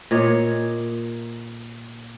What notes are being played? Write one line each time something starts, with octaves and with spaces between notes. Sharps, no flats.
A#2 C#5 D#5